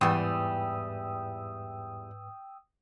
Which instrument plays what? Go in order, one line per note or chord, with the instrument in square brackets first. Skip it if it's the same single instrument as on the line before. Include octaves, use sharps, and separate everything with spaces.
[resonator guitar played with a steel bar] E2 G3 [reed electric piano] G#2 B4 [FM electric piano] G5 D#6 E6